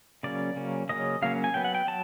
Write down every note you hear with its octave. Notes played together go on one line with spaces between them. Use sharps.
C#3 F#3 A#3 C#4 D5
C#3 F#3 A#3 C#4
C#3 F#3 A#3 C#4 D#5
C#3 F#3 A#3 C#4 F5
G#5
F#3 B3 G5
F#5
G5
F#3 A5